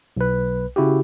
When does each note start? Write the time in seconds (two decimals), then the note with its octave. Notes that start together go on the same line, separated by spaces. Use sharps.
0.17 B1 B4
0.76 C#3 E4 F#4 G4